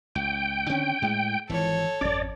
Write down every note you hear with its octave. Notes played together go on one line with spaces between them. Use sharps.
C#2 G5
D3 D#3 C4 C#4
A2 G#3
G#1 E3 F3 A4 C#5
G#1 F2 C#4 D5